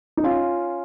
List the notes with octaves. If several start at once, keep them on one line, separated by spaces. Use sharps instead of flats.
D#4
C#4 F4